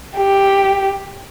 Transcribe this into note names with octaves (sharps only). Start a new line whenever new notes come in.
G4